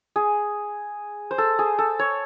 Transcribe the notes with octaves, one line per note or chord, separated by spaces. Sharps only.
G#4
C5
A4
G#4
A4
C#5